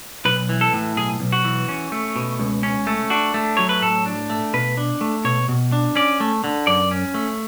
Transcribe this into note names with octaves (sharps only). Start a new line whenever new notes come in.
B1 B4
E3
A4
A2
B1 G#4
B1
F#4
E3
C#4
A3
B2
C#2
C#4
A3
D4 F#4
A3
F#3 C#5
B4
A2 A4
D4
A3
B2 B4
D4
A3
B2 C#5
B2
D4
C#4 D5
A3
D3
F#2 D5
C#4
A3